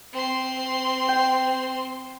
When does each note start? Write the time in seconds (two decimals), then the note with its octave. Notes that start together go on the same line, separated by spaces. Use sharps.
0.13 C4 C6
1.08 G5